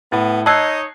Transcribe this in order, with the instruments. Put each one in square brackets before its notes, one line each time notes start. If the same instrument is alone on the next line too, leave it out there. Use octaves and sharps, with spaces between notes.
[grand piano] A2 [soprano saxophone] B3
[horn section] D#4 C#5 [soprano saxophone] D#5 [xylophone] A5 E6 [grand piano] F#6 G#6 C7